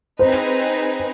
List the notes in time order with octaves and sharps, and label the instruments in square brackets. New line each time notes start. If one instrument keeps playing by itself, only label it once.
[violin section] C4 D#4 G#4 B4 [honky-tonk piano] C5